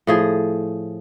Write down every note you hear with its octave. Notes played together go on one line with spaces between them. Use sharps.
A2 F3 G#4